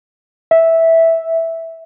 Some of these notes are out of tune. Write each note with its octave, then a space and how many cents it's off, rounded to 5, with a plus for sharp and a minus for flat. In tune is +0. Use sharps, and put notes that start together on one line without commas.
E5 -10